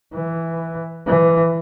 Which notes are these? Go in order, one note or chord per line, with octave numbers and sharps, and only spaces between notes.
E3
E3